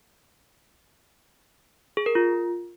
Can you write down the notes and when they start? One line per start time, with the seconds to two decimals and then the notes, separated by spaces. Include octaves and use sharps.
1.97 G#4
2.06 A#4
2.15 F4